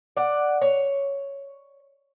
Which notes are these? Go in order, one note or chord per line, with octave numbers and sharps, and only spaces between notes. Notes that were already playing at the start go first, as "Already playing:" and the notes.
D5 F#5
C#5